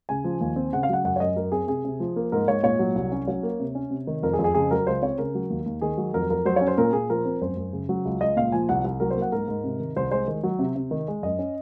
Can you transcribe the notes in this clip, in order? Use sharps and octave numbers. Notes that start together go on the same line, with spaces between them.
C#3 G#5
F3
D#2
C4
C#3 F#5
F5
F#3 F#5
F#2 F#5
C#5
F#2 D#5
F#3 A#4
C4 G#4
C3 G#4
C3
F3
A#3
G#2 A#4
G#2 C#5
A#2 C#5
F#3
C2
C#4
F#3 C#5
A#3
C3
C#4
C3
D#3
F2 A#4
G#4
F2
G#4
C#3 G#4
F#3 A#4
C#2 C5
C4 C#5
C#3 A#4
F#3
D#2
D#2
D#3 G#4
F#3
F2 A#4
F2 A#4
F#3 C5
C#5
C#4
C5
A#2 A#4
A#2 G#4
F3 A#4
C4
F#2 C5
F#2
C#3
F#3
C#2
C#2 D#5
A#2 F5
F3 G#5
C2 F#5
C2
F#3 A#4
C5
A#3
F#5
G#2 A#4
G#2
C3
D#3
C2 C5
G#3 C5
D#3
F#3
C3
C3
D#3
G#3
F#2 D#5
C#4